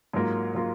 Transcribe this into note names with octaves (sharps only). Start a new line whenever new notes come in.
G#2 F#3 A#3 F4 A#4
F#3 A#3 F4 A#4